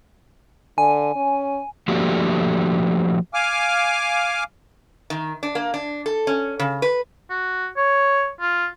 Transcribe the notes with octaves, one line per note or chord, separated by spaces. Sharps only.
D3 G#5
C#4
F3 A3 A#3 D4 F#4 G4
F5 G#5 D6 F6
D#3
D4
A#3
D4
A4
C#4
C#3
B4
F#4
C#5
F4